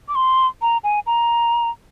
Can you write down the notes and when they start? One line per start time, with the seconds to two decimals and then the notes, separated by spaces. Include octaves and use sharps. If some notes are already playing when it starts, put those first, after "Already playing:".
0.08 D6
0.15 C6
0.62 A#5
0.84 G#5
1.06 A#5